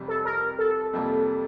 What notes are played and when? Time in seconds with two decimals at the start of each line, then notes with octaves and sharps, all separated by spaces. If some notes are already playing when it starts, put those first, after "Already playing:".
Already playing: F1 F2 C3 G3
0.08 A4
0.25 A#4
0.59 A4
0.93 F2 C3 G3 A#3